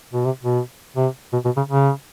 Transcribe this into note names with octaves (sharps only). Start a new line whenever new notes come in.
B2
C3
B2
C3
B2
B2
C#3
C#3